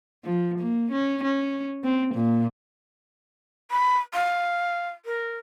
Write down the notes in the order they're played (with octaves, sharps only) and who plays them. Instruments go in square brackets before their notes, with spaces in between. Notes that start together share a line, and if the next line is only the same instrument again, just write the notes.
[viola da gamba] F3
A#3
C#4
C#4
C4
A#2
[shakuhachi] B5
F5
A#4